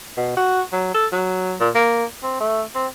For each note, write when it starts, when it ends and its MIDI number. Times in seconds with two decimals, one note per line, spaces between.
0.17 0.33 47
0.37 0.61 66
0.72 0.92 54
0.94 1.06 69
1.12 1.55 54
1.60 1.70 46
1.75 2.04 58
2.23 2.37 60
2.40 2.62 57
2.75 2.86 60